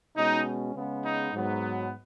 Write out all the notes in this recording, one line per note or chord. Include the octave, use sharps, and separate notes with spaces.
B2 G#3 C#4 D#4
C#3 G#3 B3
D#4
G#2 F#3 B3